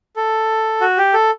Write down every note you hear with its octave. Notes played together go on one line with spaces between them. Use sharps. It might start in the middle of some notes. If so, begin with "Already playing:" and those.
A4
F#4
G4
A4